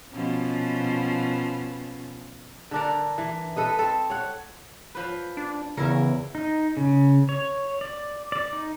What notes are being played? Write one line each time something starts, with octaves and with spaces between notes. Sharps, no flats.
B2 F3 C#4
D3 D4 A#4
E3
A4 B4 D#5
C4 A4
C#5 F#5
F3 B4
D4
E2 C#3 E4 A#4
D#4
C#3
C#5
D5
D5
D#4